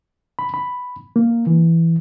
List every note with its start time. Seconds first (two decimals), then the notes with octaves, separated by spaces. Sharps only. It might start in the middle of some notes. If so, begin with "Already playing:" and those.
0.39 B5
0.54 B5
1.16 A#3
1.47 E3